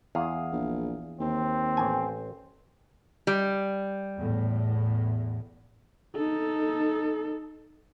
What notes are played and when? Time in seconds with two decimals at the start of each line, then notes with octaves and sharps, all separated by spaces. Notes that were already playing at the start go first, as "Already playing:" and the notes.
0.15 E2 G#4 F5 D#6
0.52 A#1
1.20 D#2 C4
1.77 A1 G#5
3.27 G3
4.18 E2 A2
6.15 D#4 A4